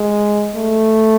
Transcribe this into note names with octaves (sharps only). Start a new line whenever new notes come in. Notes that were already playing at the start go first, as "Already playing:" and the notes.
Already playing: G#3
A3